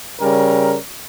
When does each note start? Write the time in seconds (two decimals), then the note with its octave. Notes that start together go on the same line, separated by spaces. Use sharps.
0.20 C#3 G3 A#4